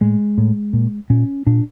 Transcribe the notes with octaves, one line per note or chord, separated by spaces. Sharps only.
A2 G#3
A2
A#2
A#2 C#4
A#2 D4